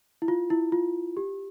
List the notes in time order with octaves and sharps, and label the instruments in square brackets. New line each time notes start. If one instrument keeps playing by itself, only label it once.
[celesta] E4
F4
E4
F4
G4